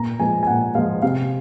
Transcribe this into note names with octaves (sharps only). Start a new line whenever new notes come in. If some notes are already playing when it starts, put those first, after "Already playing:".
Already playing: A#2 A#5
F3 G#3 G#5
G#5
A#2 F#5
F3 G#3 F5
C3 F5